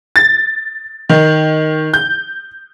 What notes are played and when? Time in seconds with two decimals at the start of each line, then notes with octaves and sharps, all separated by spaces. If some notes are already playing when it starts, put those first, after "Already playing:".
0.16 A6
1.09 D#3
1.94 G6